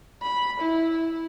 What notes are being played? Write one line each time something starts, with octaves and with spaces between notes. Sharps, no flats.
B5
E4